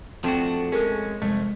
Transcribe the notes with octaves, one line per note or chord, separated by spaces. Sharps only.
F3 A3 C4 D4 F#4 G5
G#3 C#4 G#4 A#4
C2 F2 G#3 A3